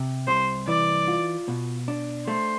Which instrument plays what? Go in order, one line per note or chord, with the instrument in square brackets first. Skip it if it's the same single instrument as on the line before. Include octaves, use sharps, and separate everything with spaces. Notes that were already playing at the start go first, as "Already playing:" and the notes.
Already playing: [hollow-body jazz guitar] C3
[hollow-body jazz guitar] C2 [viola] C5
[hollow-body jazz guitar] E3 [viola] D5
[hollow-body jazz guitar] F4
B2
D4
[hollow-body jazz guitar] A3 [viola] C5